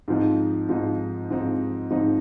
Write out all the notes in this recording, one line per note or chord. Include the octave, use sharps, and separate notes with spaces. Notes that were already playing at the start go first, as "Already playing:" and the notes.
G#2 F3 C4 D#4
G#2 F3 C4 D#4
G#2 F3 C4 D#4
G#2 F3 C4 D#4